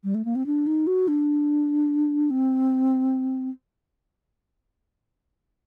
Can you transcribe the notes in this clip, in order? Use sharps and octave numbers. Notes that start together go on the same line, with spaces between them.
G3
A3
A#3
C4
D4
D#4
F#4
D4
C4